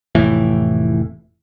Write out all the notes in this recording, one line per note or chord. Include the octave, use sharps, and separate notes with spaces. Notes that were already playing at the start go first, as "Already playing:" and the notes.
F1 A2 E3